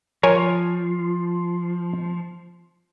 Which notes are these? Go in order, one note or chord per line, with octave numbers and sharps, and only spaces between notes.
F3 A#4 C#5 G#5